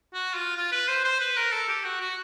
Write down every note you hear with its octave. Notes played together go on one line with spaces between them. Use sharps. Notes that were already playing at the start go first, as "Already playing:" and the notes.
F#4
F4
F4
B4
C5
C5
B4
A#4
A4
G4
F#4
F#4